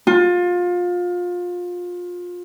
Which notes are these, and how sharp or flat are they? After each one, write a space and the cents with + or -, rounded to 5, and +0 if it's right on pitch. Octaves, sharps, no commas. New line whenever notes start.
F4 +25